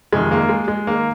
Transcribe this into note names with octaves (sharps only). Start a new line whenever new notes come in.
F2 C3 D#3 G#3
A#3
G#3
G#3
D#3 A#3